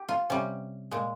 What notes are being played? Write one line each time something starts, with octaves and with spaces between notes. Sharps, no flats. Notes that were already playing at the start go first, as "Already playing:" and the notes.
Already playing: G4
F4
C3 G3 C#4
A#2 G#3